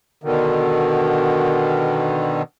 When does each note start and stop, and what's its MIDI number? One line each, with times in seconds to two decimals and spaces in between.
0.24 2.42 47
0.24 2.42 50
0.24 2.42 51